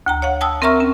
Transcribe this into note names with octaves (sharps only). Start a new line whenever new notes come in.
D2 G5 A#5
C#5 F5 F#5
G5 A5 D#6 E6
C4 A#4 E5 A#5 C#6 F6
C#4